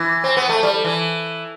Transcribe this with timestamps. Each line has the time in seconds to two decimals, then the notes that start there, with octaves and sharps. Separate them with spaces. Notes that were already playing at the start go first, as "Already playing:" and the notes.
Already playing: E3
0.24 C4
0.37 B3
0.49 A3
0.63 G3
0.85 E3